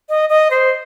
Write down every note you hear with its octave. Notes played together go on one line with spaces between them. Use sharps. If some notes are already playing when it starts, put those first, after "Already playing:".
D#5
D#5
C5